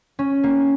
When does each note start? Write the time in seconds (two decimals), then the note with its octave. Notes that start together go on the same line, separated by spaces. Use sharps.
0.19 C#4
0.44 A#3